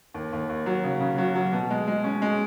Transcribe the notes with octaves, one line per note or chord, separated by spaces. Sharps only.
D#2
D#2
D#2
F#3
C#3
C#3
F#3
F#3
B2
G#3
G#3
C#4
G#3